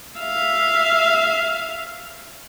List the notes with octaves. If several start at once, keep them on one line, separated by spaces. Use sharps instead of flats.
E5 F5